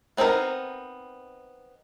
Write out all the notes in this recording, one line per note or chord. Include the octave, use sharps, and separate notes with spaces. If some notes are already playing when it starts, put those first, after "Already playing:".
B3 C4 D#4 G#4 A#4